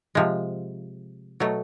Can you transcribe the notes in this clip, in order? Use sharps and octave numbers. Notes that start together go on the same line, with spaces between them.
C3 F3 G#3
B2 F#3 A3